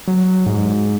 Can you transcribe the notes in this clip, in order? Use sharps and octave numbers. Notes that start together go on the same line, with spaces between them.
F#3
G#2